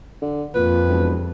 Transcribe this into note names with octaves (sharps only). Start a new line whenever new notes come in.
D3
F2 A#2 B4
E1